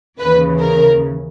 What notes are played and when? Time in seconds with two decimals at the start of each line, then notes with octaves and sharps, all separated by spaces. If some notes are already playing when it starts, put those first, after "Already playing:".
0.19 D#2 C#3 E3 B4
0.60 A#4